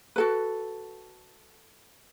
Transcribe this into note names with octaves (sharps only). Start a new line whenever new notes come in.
F#4 A4 B4